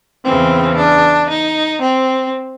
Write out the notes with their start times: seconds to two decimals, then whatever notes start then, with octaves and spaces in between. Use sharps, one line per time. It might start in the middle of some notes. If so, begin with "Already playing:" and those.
0.24 E2 C#3 E3 C4
0.76 D4
1.29 D#4
1.81 C4